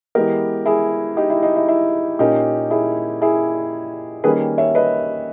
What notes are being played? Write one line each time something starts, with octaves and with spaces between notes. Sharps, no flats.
E3 G#3 B3 G4 A#4
E4 G#4
D#4 G4
E4
D#4
E4
E4
A#2 A#3 C#4 D#4 G4
E4 G#4
E4 G#4
D#3 G3 A#3 C#4 G#4 B4
C#5 E5
B4 D#5